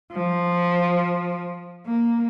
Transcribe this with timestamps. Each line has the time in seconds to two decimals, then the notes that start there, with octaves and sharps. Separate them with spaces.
0.12 F3
1.87 A#3